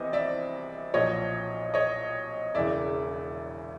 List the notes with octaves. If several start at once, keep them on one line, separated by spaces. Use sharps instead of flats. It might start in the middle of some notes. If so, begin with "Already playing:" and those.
Already playing: C2 C3 E3 B3 D#5
D5 E5
B1 A#2 F3 C#5 D#5
C#5 D#5
E1 E2 C#3 D5 E5